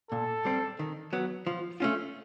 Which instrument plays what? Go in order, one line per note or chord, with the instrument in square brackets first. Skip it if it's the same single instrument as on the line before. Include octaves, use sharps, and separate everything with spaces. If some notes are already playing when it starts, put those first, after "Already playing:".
[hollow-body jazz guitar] A#2 [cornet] A4
[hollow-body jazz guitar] G3 C4
D#3
F#3 B3
F3
A3 C#4 F4